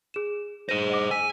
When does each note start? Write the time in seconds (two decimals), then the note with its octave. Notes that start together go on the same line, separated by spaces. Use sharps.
0.14 G#4 E7
0.69 G#4 C5 A#6 D#7 E7
0.90 D#5 F#5 D6
1.11 G#5 E6 B6